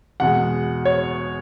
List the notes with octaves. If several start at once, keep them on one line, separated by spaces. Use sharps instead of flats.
E2 B2 G#3 F#5
C#5